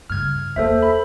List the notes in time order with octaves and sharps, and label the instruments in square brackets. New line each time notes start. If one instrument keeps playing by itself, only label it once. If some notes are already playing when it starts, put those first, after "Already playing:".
[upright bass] G2 C#3 [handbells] F6 G#6
[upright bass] E2 A#3 [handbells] A4 C5 E5
[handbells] B5